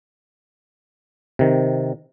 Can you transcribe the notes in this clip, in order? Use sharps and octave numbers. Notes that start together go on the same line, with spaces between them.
C3 D#3